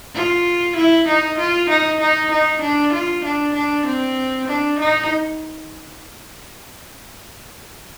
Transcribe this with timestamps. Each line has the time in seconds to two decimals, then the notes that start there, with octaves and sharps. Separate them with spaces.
0.15 F4
0.76 E4
1.08 D#4
1.38 F4
1.69 D#4
2.00 D#4
2.31 D#4
2.62 D4
2.93 F4
3.25 D4
3.55 D4
3.86 C4
4.48 D4
4.79 D#4